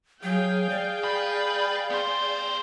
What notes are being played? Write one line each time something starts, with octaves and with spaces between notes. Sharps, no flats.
F#3 G#4 F5 G5
D5
B4
B3 C5